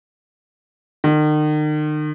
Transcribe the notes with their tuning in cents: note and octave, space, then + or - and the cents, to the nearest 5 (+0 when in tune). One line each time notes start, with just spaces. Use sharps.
D#3 -40